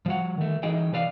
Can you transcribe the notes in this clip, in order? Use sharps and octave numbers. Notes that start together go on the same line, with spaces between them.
F3 G3 F#5
D#3 A3
E3 D#4 G#4 D#5 G5
C3 E3 B4 D5 F5